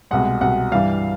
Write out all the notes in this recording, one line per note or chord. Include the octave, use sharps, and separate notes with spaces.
C2 B2 G#3 F#5
C2 B2 G#3 F#5
G2 E3 G3 F5